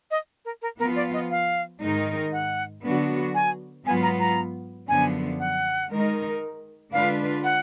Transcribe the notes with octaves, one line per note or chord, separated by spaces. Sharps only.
D#5
A#4
A#4
F3 B3 F4 A#4
D5
D#5
F5
G#2 D#3 G#3 D#4 A#4
F#5
D3 F#3 B3 D4 F#4
G#5
G#2 F#3 B3 F4 G#5
A#5
A#5
F#2 D3 F3 B3 G#5
F#5
D#3 G#3 D#4 A#4
D3 G#3 D4 F4 B4 F5
F#5